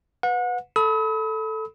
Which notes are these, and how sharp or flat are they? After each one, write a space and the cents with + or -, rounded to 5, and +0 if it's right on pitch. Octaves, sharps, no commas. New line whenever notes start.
B4 +0 F#5 -35
A4 +0 B5 +0 D#6 +45